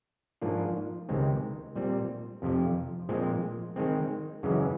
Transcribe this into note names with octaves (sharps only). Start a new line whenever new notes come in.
G#2 F3 A#3 D4 F4
C#2 C3 D#3 G#3 C4
A#2 G3 C4
F2 C3 F3
A#2 F3 G#3 C4
D#3 G#3 C4
F#2 C#3 E3 G#3